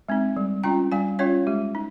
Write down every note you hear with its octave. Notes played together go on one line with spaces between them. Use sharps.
G#3 C4 D#4
G3
C#4 F4 G5 A#5
G3 F5 G#5
C#4 F4 C#5 F5
G#3 G4
D#4